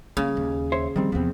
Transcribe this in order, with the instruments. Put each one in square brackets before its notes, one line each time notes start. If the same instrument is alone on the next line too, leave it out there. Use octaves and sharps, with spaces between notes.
[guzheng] C#3 [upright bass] G3 A#3
[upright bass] D#2
[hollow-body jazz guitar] C5 C#5 E5
[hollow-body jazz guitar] D#3 G3 C4 [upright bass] F3
[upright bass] E2 C3 [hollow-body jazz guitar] F3 B3 C4